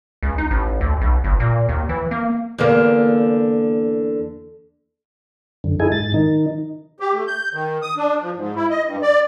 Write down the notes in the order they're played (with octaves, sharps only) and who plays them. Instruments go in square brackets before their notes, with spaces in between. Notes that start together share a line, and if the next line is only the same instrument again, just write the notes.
[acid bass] C#2
D#4
A1
D2
B1
G1
A#2
D#2
E3
A#3
[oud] E2 D3 A#3
[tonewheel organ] F#2 D3
D#4 E4 G#4 A4 G#5
G#2 A6
D#3 D#4
[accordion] G4
A3
G6
D#3
D#6
D4
F3
G#2
E4
D#5
G2
D5